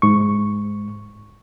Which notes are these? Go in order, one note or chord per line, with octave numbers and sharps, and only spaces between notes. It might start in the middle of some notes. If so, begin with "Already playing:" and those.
G#2 C#6